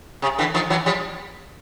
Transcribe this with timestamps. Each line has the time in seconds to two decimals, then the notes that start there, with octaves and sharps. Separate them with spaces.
0.22 C3
0.38 D3 E3
0.54 D#3 F3
0.70 E3 F#3
0.86 F3 G3